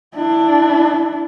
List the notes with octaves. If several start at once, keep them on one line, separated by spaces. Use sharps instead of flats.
D4 E4